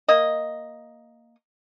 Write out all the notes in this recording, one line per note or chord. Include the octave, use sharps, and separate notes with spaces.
A#3 D#5